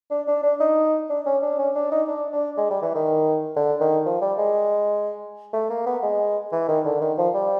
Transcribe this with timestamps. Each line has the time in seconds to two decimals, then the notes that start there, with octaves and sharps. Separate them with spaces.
0.11 D4
0.27 D4
0.43 D4
0.60 D#4
1.10 D4
1.26 C#4
1.42 D4
1.59 C#4
1.75 D4
1.91 D#4
2.08 D4
2.33 D4
2.57 G#3
2.70 G3
2.82 E3
2.95 D#3
3.56 D3
3.81 D#3
4.06 F3
4.22 G3
4.38 G#3
5.53 A3
5.70 A#3
5.86 B3
6.03 G#3
6.52 E3
6.68 D#3
6.85 D3
7.01 D#3
7.18 F3
7.34 G3